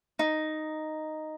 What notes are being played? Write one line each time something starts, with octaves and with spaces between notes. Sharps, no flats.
D#4